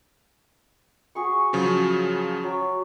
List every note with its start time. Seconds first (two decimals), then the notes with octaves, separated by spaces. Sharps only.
1.15 F#4 G#4 C#6
1.53 C#3 F3 F#3
2.43 F#3